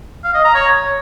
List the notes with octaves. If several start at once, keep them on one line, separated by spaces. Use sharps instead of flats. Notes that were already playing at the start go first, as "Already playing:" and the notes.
F5
D#5
A#5
C#5